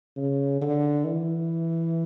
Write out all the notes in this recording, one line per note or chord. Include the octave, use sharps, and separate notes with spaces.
C#3
D3
E3